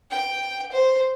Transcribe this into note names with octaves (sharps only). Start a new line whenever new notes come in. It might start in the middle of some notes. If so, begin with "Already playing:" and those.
G5
C5